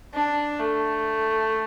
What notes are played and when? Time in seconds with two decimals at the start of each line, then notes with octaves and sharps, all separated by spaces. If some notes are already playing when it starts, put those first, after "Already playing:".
0.14 D4
0.60 A3